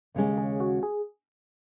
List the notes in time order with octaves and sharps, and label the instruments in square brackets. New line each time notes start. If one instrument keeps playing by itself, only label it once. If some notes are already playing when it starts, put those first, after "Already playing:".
[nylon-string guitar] D#2 C#3 G#3 C#4
[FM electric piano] G#4
F#4
G#4